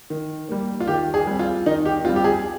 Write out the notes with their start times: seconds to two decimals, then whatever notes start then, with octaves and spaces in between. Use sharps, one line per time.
0.10 D#3
0.49 G3 A#3
0.80 F4
0.88 D#3 G4
1.14 G#4
1.27 G3 C4
1.39 F4
1.66 D#3 D#4
1.85 G4
2.05 G3 C4 F4
2.16 G4
2.24 G#4